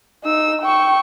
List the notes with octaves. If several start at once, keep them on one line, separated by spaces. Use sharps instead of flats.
D#4 E6
G5 C#6